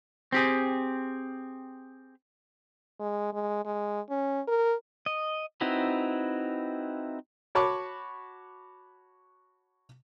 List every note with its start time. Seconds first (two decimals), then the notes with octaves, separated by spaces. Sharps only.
0.32 C4 G4 G#4
3.00 G#3
3.33 G#3
3.65 G#3
4.10 C#4
4.48 A#4
5.06 D#5
5.61 C4 D#4 E4 F#4 B4
7.55 F#4 C#5 A5 B5 C#6 D6